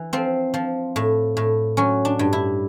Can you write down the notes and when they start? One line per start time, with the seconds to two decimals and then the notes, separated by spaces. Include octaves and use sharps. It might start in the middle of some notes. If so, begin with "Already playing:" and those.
Already playing: E3
0.13 F3 C4
0.54 F3
0.96 A2
1.37 A2
1.77 F#3 C#4
2.05 D4
2.19 G2
2.33 E4